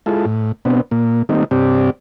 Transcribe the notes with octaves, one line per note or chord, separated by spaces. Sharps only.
G#3 E4 F4 A4
A2
B2 B3 C4 D4
A#2 A#3
D#3 G3 A3 A#3 C4 D#4
G2 C3 C4 G4 D5